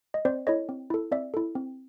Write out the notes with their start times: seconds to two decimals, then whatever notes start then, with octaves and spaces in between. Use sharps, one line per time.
0.14 D#5
0.25 C4 C5 D5
0.47 E4 A4 C#5 D#5
0.69 C4
0.90 E4 A4
1.11 C4 D5 E5
1.34 E4 A4
1.55 C4